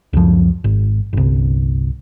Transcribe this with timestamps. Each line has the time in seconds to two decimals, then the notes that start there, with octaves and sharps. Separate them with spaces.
0.13 C#2 F#2 F3
0.64 G#1
1.13 G1 C2